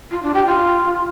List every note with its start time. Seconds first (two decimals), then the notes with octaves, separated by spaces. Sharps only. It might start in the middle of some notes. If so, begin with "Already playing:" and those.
0.11 F4
0.23 D4
0.34 G4
0.46 F4